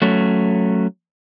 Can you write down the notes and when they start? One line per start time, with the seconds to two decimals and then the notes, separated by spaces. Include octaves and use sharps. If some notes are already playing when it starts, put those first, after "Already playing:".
0.02 F#3 A3 C#4